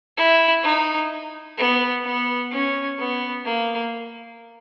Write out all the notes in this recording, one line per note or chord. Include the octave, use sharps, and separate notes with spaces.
E4
D#4
B3
B3
C#4
B3
A#3